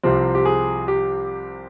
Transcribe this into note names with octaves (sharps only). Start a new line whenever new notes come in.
C2 C3 F3 C4
G4
G#4
G4